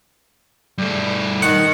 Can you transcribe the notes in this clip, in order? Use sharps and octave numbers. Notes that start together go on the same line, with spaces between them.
G2 A3
D#3 F#5